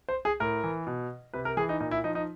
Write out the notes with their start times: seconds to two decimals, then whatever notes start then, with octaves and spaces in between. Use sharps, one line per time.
0.09 C5
0.25 G#4
0.40 A2 A#4
0.64 E3
0.87 B2
1.34 C3 B4
1.45 A#4
1.57 E3 G#4
1.69 D#4
1.80 A#2 D#4
1.91 E4
2.04 F3 D#4
2.15 D#4